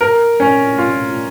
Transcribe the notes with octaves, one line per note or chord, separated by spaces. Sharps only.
A#4
C#4
F4